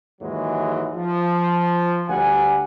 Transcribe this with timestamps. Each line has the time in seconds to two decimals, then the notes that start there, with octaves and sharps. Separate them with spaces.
0.21 D#2 G#2 E3 F#3 G#3
0.96 F3
2.09 D2 G3 F#5 G#5